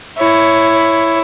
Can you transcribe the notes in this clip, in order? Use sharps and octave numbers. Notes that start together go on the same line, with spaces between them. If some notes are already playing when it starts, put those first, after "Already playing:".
E4 C#5